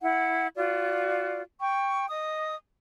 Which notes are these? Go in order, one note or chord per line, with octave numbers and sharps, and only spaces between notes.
E4 F#5
F4 F#4 D5
G5 C#6
D#5 D#6